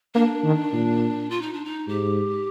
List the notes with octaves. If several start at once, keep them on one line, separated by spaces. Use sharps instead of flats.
A#3 D4
D#3
A#2
F4
D#4
D4
D#4
G#2 G4